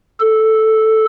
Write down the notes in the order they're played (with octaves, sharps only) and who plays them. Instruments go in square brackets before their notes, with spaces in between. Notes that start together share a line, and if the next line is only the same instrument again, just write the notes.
[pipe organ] A4